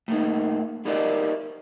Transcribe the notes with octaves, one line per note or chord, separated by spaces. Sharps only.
A2 A#3 D#4
D#4 E4 G4 A#4 D5 D#5